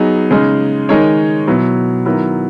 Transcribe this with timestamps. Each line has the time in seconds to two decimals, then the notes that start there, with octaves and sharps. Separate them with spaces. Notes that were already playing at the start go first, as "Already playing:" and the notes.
Already playing: F#3 B3 D#4 G#4
0.31 C#3 G#3 D#4 G#4
0.89 D#3 G#3 D#4 A#4 C#5
1.47 B2 F#3 B3 E4
2.05 D#3 F#3 B3 E4 A#4